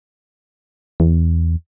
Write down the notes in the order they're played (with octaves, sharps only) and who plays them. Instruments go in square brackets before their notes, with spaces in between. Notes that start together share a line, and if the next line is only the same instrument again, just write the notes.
[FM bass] E2